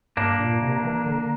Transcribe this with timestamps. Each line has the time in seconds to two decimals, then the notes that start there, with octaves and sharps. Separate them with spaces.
0.17 G2 A#3 D4
0.40 A#2
0.62 C3
0.84 E3
1.06 D3